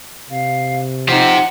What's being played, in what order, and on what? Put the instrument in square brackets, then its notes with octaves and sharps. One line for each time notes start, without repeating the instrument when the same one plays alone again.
[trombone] C3 [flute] F5
[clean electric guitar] F3 D#4 [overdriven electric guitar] G4 C5 [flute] F#5